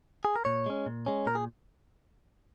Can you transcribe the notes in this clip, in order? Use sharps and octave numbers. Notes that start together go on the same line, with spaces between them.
G#4
A#4
A#2 C#5
G#3 C#4
A#2
G#3 C#4
A#2 A#4
G#4